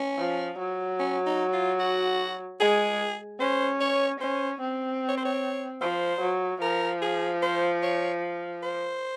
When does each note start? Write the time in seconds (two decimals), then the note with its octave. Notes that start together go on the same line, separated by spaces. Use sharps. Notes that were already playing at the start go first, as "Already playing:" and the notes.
Already playing: C#4
0.18 F3
0.59 F#3
0.99 C#4
1.26 D#4
1.53 F4
1.80 F#4
2.60 G#3 G#4
3.40 C#4 C5
3.80 C#5
4.21 C#4 C5
4.61 C4
5.09 C#5
5.17 C5
5.25 C#5
5.81 F3 C5
6.21 F#3
6.61 F3 A#4
7.02 G#4
7.42 C5
7.83 C#5
8.63 C5